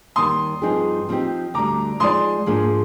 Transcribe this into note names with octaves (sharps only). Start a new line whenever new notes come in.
D#2 D#3 G3 C6 D#6
G2 F3 C4 D#4 G#4
F3 C4 D#4 G4
D2 D3 G3 A#5 D6
F3 G#3 D#4 A#4 D5 C6 D#6
G#2 F3 A#3 D4 G#4